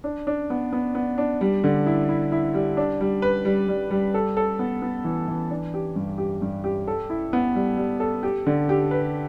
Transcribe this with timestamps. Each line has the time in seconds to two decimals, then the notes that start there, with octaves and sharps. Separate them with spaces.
0.04 D4
0.27 D4
0.50 B3
0.73 B3
0.95 B3
1.18 D4
1.41 G3
1.64 D3
1.86 E4
2.09 E4
2.32 E4
2.54 G3
2.77 D4
3.01 G3
3.22 B4
3.45 G3
3.68 G3
3.91 G3
4.14 A4
4.37 A4
4.59 B3
4.82 B3
5.04 E3
5.28 E3
5.50 D4
5.74 G4
5.96 G2
6.18 G4
6.42 G2
6.64 G4
6.88 A4
7.10 E4
7.33 B3
7.55 G3
7.77 G3
8.00 A4
8.23 G4
8.47 D3
8.69 G4
8.91 B4